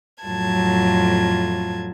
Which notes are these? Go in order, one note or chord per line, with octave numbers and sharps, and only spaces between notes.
F2 A2 F#3 F4 A5 G#6